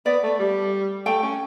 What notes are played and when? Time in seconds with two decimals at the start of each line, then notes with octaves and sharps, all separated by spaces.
0.06 B3 D5
0.23 A3
0.39 G3
1.06 A3 G5
1.23 C#4